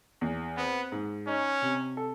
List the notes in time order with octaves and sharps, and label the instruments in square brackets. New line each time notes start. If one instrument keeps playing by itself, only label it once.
[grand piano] E2
[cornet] B3 [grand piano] C4
[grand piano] G#2
[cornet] C#4 [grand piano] D#4
[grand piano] C3
A4